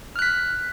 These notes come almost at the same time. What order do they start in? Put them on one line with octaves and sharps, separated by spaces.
F6 F#6 B6